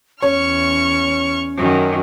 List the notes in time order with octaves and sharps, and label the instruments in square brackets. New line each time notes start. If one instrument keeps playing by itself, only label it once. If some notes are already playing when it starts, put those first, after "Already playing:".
[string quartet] E2 C#6 F6 [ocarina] C#4 [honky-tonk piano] C#5
[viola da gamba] F#2 D#3